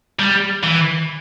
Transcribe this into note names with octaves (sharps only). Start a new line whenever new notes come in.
G3
E3